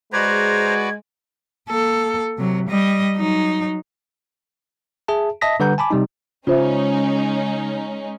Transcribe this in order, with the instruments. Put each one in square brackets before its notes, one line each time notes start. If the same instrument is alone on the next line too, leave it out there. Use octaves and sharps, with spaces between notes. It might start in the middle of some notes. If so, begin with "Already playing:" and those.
[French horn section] G#3 [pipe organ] F#4 B4 D5 [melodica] C5 A#5 [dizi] G#6
[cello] A#3 A4
C3 F#3
G3 D#5
F#3 D#4
[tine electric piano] G#4 E5 A5
D#5 E5 A5 D#6 A#6 B6
D3 G3 B4 F#5 A#5 G6
G#5 A5 B5 D6
C3 G3 D#4
[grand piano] C#3 [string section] G#3 C#4 D#4 [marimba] F4 C5 E5